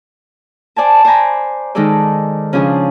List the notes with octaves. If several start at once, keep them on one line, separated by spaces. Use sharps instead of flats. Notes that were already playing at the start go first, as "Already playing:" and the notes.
C5 D5 G#5 A5
C5 D5 G5 G#5 A#5 B5
D#3 G#3 D#4 G#4 A4 D5
C#3 F3 C#4 D4 G#4